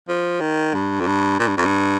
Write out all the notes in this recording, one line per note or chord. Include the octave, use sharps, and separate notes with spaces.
F3
D#3
G2
F2
G2
A#2
G2
F2
G2